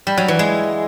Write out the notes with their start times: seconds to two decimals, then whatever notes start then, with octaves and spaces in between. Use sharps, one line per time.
0.07 G3
0.18 F#3
0.28 E3
0.39 G#3